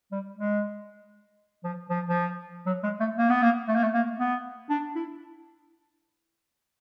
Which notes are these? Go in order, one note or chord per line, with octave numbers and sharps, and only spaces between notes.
G3
G#3
F3
F3
F3
F#3
G#3
A3
A#3
B3
A#3
A3
A#3
A3
A#3
B3
D4
E4